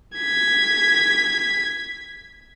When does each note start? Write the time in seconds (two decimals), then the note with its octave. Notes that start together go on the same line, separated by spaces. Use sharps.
0.17 G#6 B6